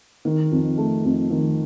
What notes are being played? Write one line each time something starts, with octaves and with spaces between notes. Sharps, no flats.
D#3
F2
A3
F2
D#3